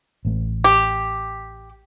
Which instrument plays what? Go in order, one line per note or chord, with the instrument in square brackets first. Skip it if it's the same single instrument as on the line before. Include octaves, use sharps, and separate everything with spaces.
[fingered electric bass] A1 A3
[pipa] G4